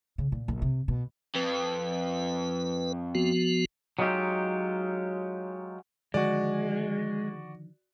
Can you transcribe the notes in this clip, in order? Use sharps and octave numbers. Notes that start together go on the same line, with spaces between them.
C#3
A#2
A#1
C3
B2
F2 B4
F3 B3 F#4
F#3 G#3 D#4 F4 G4
D3 D#3 F3 G#3 F#4 D5